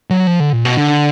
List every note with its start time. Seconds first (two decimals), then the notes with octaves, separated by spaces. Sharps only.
0.10 F#3
0.27 F3
0.40 D3
0.52 A#2
0.65 B2
0.77 D3